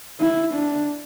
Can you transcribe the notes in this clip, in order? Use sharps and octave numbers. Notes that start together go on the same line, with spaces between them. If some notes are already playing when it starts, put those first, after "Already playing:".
E4
D4